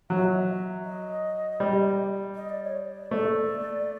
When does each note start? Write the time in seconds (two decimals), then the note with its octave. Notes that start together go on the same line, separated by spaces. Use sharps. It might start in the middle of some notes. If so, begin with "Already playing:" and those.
0.09 F#3 F5
0.17 E5
0.24 D#5
0.32 E5
0.84 D#5
1.60 G3
2.35 D#5
2.50 D5
2.64 C#5
2.77 D5
3.11 A3